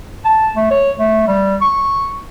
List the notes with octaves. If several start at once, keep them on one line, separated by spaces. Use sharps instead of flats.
A5
A3
C#5
A3
G3
C#6